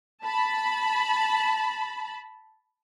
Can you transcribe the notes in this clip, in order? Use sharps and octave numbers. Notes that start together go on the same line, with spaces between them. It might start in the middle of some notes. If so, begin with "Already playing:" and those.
A5 B5